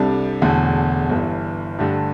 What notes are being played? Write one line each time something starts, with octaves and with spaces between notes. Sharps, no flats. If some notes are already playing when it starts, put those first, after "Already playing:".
Already playing: C2 C3 G3 D4 A4
E1 E2 D3 A3
G1 G2 E3
G2 D3 A3 D4 G4